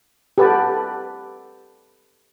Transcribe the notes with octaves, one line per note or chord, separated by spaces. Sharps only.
G4 A4 B4 F#5 A5 D6